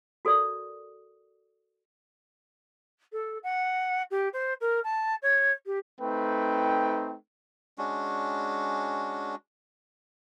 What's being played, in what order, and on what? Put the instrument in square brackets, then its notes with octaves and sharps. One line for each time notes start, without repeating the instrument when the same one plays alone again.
[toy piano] F#4 A4 A#4 D5 D#6
[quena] A4
F#5
G4
C5
A#4
A5
C#5
G4
[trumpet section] A3 C4 D#4 B4 G5
[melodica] G#3 C#4 D4 F#4